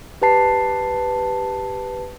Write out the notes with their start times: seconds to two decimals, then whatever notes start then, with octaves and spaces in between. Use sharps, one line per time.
0.22 G4 B4 A5 C7